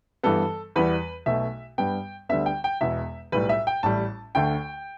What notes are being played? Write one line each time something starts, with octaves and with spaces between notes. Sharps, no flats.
G2 E3 G3 B3 A4
E2 E3 G3 B3 B4
B1 B2 A3 E5
G2 G3 B3 G5
D2 D3 G3 B3 E5
G5
G5
E1 E2 B2 B3 E5
B1 A2 G3 B4
E5
G5
A1 A2 G3 A5
D2 D3 A3 G5